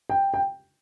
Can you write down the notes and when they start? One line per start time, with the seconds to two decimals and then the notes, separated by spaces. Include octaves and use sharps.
0.10 G5
0.34 G5